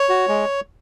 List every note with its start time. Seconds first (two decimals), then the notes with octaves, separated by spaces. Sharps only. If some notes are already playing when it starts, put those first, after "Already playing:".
Already playing: C#5
0.09 F#4
0.29 G#3